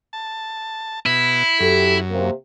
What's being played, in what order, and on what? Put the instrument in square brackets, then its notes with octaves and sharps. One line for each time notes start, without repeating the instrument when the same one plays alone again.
[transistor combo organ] A5
[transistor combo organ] B2 [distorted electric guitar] E4
[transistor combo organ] F#2 [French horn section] G4 A4
[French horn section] C3 A#3